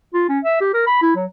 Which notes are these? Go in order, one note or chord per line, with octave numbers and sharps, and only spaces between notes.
F4
C#4
E5
G4
A#4
B5
E4
F#3